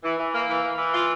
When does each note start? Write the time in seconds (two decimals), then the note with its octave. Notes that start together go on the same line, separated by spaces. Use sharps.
0.04 E3
0.18 E3
0.34 A#3
0.49 E3
0.63 E3
0.78 E3
0.94 F4